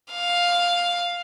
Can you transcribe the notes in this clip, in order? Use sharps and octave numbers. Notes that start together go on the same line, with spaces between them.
F5